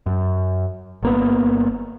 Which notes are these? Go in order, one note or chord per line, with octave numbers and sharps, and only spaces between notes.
F#2
G1 A#3 B3